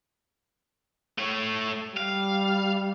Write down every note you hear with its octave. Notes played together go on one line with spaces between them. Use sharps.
A3 C#5
G3 F5